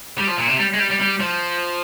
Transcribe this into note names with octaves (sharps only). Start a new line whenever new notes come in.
G3
F3
A#2
C3
G3
G#3
G3
G3
G3
F3